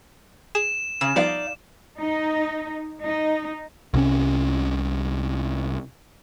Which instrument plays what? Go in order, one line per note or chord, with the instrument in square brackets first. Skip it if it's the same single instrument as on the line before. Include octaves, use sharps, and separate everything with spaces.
[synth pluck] G#4 [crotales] E7
[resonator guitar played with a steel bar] C#3 [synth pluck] E6 [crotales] E7
[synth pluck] F3 G3 B3 [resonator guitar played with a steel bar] D#4 D5 F5
[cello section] D#4
D#4
[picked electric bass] C2 C3 C#4